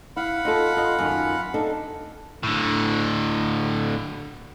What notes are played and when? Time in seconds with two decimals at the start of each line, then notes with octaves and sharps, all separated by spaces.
0.17 E4 F5 F#5 B5
0.45 D#4 F4 A4
0.77 F4 D#5
0.99 F#2 D#3 F4
1.54 D4 D#4 A4
2.43 A2 D3